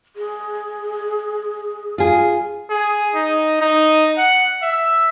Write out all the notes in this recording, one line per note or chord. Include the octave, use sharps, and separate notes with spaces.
G#4
F4 G#4
G#4
D#4
D#4
F#5
E5